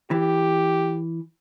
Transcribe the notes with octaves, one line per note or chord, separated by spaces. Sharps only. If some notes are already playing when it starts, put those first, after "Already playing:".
E3 G4